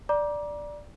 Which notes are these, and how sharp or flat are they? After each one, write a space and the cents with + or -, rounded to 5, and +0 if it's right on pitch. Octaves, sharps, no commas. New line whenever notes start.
D5 +0 A#5 +30 D6 +0